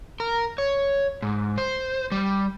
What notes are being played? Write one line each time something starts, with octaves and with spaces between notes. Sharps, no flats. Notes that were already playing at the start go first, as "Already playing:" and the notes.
A#4
C#5
G#2
C5
G3